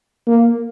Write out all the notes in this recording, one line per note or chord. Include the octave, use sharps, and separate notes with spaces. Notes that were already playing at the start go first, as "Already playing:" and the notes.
A#3